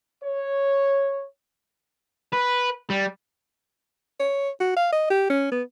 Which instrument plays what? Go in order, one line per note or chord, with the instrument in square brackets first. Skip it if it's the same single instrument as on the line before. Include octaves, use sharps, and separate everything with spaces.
[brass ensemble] C#5
[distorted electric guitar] B4
G3
[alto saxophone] C#5
F#4
F5
D#5
G4
C#4
B3